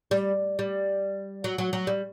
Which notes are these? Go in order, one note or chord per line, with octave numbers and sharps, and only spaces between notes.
G3
G3
F#3
F#3
F#3
G3